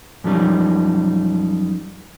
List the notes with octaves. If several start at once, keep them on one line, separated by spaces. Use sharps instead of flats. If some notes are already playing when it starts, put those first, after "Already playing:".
F#2 F3 G3 D#4